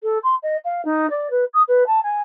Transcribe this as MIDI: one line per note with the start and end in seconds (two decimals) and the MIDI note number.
0.03 0.18 69
0.23 0.35 84
0.43 0.57 75
0.65 0.84 77
0.85 1.09 63
1.10 1.28 74
1.31 1.45 71
1.54 1.62 87
1.68 1.84 71
1.87 2.03 81
2.03 2.21 80